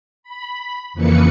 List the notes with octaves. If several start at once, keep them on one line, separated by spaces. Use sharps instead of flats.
B5
F2 C#3 E3 A#3 B4 C#7